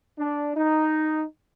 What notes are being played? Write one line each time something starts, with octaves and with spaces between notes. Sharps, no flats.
D4
D#4